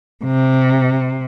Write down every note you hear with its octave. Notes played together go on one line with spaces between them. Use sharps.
C3